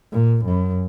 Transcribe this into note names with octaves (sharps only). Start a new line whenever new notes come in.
A#2
F#2